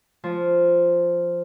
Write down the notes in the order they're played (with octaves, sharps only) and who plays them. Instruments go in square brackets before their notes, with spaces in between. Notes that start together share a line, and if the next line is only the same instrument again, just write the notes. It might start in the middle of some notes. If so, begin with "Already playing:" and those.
[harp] F3